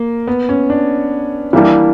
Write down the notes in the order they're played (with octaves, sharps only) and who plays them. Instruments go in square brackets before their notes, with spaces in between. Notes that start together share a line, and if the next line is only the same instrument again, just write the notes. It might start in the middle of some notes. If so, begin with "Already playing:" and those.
Already playing: [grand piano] A#3
B3
C#4
D4
[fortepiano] E3 G3 A#3 D4 [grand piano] E4